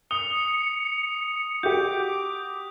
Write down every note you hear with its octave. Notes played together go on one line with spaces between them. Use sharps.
D#6 C#7 G7
F#4 G4 D6 G6